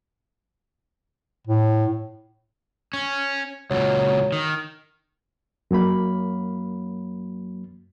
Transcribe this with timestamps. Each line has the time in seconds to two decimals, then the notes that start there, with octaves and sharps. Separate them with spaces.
1.47 A2
2.93 C#4
3.71 C#2 A#2 F#3
4.32 D#3
5.71 F#2 F#3 A#3 B5